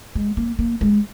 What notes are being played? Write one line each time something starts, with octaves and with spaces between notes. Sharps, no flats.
G#3
A#3
A#3
G#3